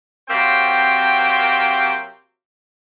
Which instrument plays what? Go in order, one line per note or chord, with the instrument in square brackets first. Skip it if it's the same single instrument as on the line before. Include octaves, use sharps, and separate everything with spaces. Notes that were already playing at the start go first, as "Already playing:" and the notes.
[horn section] C3 F#3 A#3 C4 C5 G5